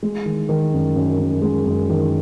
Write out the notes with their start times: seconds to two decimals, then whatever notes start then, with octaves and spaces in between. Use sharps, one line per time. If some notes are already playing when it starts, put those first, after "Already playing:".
0.03 G#3
0.26 D#3
0.49 D#3
0.73 F#2
0.96 F#2
1.19 F#2
1.42 G#3
1.66 F#2
1.90 D#3